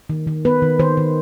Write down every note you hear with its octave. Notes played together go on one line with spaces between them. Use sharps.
D#3
D#3
B3 B4
D#3
D#3 C5
D#3